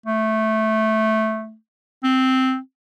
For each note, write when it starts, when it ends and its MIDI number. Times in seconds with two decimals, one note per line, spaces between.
0.06 1.56 57
2.04 2.59 60